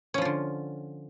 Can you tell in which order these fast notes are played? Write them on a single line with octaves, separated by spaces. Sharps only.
C#4 F3 F4 D3